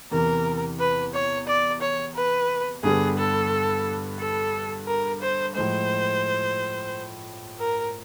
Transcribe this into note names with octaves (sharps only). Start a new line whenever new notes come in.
E2 C3 E3 A#4
B4
C#5
D5
C#5
B4
G2 D3 G3 B3 G#4
A4
A4
A#4
C5
A2 F3 G#3 C5
A#4